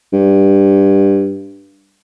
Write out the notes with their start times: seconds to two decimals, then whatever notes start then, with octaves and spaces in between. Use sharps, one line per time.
0.13 G2